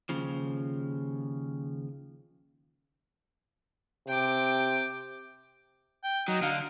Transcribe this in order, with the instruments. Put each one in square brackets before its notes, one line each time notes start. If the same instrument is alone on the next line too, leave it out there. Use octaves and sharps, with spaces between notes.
[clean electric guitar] D#2 C#3 F3
[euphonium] C3 [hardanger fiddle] G5 D6
[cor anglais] G5
[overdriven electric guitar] F#3 [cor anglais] D#4
[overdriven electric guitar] D3 [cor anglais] F5